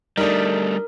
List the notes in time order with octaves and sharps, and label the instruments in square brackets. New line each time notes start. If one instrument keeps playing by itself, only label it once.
[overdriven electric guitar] G3 A3 [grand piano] D4 D#4 [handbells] A#4